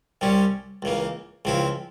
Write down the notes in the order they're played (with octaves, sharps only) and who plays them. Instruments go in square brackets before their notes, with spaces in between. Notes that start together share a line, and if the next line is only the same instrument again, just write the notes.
[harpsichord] C2 C3 G3 C#4
C#2 C#3 E3 A#3
C#2 C#3 F3 C4 E4